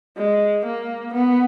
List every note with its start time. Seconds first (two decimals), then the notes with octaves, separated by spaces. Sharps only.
0.17 G#3
0.66 A#3
1.14 B3